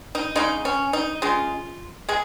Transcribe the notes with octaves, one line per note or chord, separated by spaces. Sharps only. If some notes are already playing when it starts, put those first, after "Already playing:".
D#4
C#3 G#3 D#4
C#4
D#4
C#3 G#3 F4
G#3 G#4